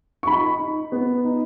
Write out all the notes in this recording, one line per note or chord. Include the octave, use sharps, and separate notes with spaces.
C#6
D#4 B5
D#4
B3
D#4